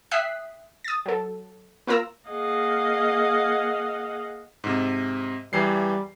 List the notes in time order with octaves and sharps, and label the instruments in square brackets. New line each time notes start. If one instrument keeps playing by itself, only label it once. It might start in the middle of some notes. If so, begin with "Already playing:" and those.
[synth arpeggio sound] E5 G5 D#6 F#6 B6 C7
D#6 A6
F#3 A4
A#3 F4 A#4 A#5 E6
[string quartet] A#3 G#4 D#5 F5 F#5
[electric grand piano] G#2 C3
[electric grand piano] E2 E3 C7 [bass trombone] G3